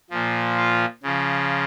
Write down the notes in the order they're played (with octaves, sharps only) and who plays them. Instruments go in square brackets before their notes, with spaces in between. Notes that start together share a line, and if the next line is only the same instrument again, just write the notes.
[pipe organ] A#2 F3
F4
C#3 F3